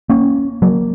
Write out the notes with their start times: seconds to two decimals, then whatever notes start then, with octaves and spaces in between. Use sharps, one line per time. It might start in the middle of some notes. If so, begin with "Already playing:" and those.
0.10 A#3 C#4
0.62 F#3 A#3